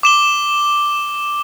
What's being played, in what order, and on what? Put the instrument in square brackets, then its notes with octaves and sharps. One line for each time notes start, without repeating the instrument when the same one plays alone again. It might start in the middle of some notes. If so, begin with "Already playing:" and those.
[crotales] D6 E7 G7